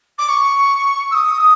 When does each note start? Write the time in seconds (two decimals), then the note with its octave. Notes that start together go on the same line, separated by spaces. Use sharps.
0.18 D6
0.28 C#6
1.10 E6
1.14 D#6